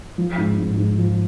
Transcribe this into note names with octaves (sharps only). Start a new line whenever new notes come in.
F3
G#2
G#2
G#2
F3